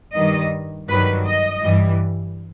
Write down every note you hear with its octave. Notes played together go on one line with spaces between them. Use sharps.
G2 D#3 G3 D#5
G2 D#3 F#3 B4
D#5
G2 E3 G3